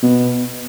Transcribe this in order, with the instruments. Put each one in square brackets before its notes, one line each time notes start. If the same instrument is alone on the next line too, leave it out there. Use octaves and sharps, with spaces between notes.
[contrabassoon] B2